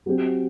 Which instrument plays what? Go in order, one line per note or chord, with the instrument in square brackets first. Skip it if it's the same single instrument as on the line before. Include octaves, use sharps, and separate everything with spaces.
[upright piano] F#3 C4 G4